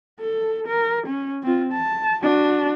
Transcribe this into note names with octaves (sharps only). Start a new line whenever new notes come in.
A4
A#4
C#4
C4 F4
A5
D4 F#4